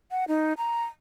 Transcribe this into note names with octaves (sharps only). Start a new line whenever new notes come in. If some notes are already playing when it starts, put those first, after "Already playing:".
F#5
D#4
A#5